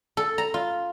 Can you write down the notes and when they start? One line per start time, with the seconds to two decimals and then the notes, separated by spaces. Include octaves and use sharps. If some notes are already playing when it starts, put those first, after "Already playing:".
0.17 A4
0.38 A#5
0.54 F4